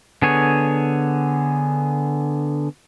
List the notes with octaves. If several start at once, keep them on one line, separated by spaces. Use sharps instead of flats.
D3 B3 G#4 C#5